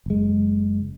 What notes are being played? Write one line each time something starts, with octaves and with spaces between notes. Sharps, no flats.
F#1 G#3